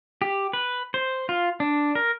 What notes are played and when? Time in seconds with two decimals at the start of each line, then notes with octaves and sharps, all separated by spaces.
0.22 G4
0.53 B4
0.94 C5
1.29 F4
1.60 D4
1.95 A#4